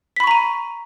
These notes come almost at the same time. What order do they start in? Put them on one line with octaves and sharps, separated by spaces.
B6 B5 C#6 A#5 D#7